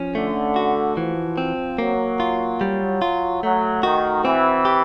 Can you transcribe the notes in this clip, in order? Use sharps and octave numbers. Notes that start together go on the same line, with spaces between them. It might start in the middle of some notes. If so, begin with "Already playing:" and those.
Already playing: F3 C#4
D3 A3
F#4
E3 F3
C4
F#3 A#3
F4
G3
F4
F#3 A3
D#3 F#4
E3 C4
G4